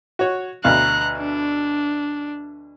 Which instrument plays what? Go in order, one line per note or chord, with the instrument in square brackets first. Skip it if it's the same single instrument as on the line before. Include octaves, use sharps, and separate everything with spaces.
[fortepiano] F#4 C#5
[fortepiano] D2 B2 F5 [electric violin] A#5 F#6
[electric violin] D4